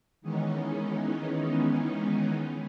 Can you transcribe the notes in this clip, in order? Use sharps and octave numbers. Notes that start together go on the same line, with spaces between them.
D#3 E3 G#3 B3 C#4 D#4